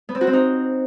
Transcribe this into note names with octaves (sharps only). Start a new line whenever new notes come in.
B3
C4
F#4
C4
D#4